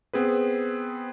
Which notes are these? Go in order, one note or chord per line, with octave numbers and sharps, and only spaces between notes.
B3 C4 G#4 B4